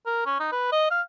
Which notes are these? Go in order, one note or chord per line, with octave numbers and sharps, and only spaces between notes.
A#4
C#4
D#4
B4
D#5
F5